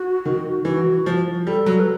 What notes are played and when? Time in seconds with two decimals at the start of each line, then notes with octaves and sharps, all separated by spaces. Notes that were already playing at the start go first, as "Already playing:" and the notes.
Already playing: F#4
0.25 D#3
0.65 E3 F#4
1.06 F3
1.47 G3 A4
1.66 F#3
1.79 B4